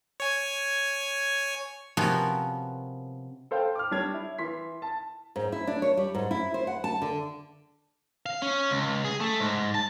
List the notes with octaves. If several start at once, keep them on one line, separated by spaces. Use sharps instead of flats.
C#5 G#5
C3 F3 B3 C#4 F#4 A#4
A4 C5 F5 G5
D6 F6
G3 D4 C#5 G#6 F7
E4
E3 C6 B6
A5
G#2
E4
D4
C#5
G3
G#2
E4
C5
F#5
A5
D3
F5
C#4
C#2
G#4
A3
G#2
A5